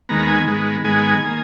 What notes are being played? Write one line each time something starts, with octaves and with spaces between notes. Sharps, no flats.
D#2 D#3 G#3 B3 A#5
G#5
G#2 D#3 G#3 B3
G#2 D#3 G#3 B3 G#5
G#5
D#3 A#3